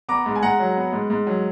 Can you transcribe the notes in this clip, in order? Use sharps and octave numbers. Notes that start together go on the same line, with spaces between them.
B3 A#5 D6
G#2
G#5
G#2 F#5 A#5
F#3
B3
G#2
G#2
F#3